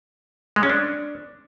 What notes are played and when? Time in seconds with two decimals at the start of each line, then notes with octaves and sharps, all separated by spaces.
0.56 G#3
0.63 C#4
0.70 D4